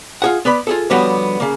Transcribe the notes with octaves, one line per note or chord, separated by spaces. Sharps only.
F4 G#4 F#5
B3 B4 D5 B5
F4 G#4 A4
D3 F3 G3 B3 F#4 C#5
C#3 A#3